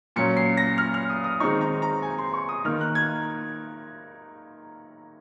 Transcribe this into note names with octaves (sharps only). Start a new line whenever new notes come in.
A#2 F#3 C#4 C#7
C7
A#6
F6
F6
D#6
D#6
D#3 G#3 C4 D#4 C#6
A#5
A#5
G#5
C6
C#6
D#6
D#3 A#3 D#4 F6
F#6
G#6